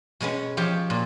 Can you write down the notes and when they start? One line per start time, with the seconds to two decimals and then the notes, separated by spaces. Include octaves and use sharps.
0.20 B2 G#3 B3 C#4
0.57 F3 G4 C#5
0.90 A#2